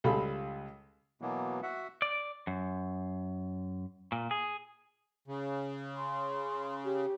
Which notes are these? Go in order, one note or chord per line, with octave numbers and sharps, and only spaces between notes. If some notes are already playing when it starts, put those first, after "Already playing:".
C#2 G3 G#4 A4 F5 B5
B2 E3 F#3 A#3 B3
F#4 E5 F#5
D5
F#2
A#2
G#4
C#3
C6
G4